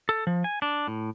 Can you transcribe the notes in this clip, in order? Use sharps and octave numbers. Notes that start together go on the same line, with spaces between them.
A4
F3
G#5
D4
A2